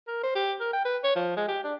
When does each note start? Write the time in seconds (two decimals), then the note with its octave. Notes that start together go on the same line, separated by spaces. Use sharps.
0.07 A#4
0.23 C5
0.35 G4
0.60 A#4
0.73 G5
0.85 B4
1.04 C#5
1.15 F3
1.37 G#3
1.48 G4
1.64 D4